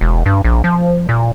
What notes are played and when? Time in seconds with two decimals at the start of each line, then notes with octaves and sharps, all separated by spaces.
0.01 E1
0.26 G2
0.44 A#1
0.64 F3
1.09 A#2